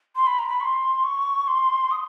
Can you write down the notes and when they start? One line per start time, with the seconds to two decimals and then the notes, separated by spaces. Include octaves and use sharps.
0.16 C6
0.27 B5
0.39 A#5
0.48 B5
0.61 C#6
0.65 C6
1.04 C#6
1.48 C6
1.91 D#6